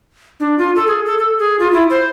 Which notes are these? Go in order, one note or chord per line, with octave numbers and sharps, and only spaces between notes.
D4
F4
A4
G#4
A4
A4
G#4
F4
E4
C5